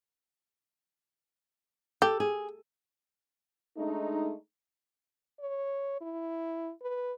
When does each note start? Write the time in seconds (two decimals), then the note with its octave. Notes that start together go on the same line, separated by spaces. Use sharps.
2.02 G4 A4
2.20 G#4
3.78 G#3 A3 D4 D#4
5.40 C#5
6.01 E4
6.82 B4